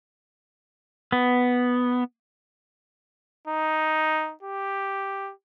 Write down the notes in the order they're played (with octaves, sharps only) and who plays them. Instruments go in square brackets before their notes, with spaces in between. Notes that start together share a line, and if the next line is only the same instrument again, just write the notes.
[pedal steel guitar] B3
[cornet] D#4
G4